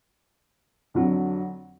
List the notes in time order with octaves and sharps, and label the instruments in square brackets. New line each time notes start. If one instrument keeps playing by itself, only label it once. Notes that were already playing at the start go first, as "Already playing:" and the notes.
[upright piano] F2 D3 F#3